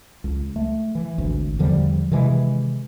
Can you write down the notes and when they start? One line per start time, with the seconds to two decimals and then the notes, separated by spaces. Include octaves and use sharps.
0.24 C#2
0.56 A3
0.95 E3
1.18 G#1 D2
1.59 E2 D3 F3 G3
2.11 C3 D#3 E3 G#3